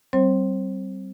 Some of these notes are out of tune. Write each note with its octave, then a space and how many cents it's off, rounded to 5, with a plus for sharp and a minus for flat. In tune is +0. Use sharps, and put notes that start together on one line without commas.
G3 -35 C4 +0 C5 +35